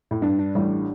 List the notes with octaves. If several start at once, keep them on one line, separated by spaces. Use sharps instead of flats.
A2
G2 D4
D4
A1 A2 G3